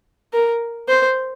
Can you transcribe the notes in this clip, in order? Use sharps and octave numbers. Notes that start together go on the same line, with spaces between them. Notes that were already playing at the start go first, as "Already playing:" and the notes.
A#4
C5